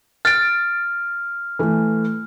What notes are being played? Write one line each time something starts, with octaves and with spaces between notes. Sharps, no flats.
F6 A6 D7
E3 A3